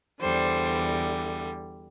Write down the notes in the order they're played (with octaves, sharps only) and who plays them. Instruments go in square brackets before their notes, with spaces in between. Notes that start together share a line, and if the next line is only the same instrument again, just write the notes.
[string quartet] E2 D3 G3 C5